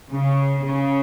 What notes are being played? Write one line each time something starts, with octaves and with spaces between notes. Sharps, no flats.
C#3
C#3